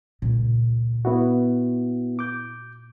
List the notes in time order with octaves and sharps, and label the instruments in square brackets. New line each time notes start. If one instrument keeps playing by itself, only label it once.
[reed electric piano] C#2 [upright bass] A#2
[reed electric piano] B3 E4 F#4
D6 G6